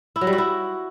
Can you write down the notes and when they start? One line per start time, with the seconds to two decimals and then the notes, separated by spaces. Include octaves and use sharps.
0.16 E4
0.21 F#3
0.27 G3
0.33 F#4
0.38 E4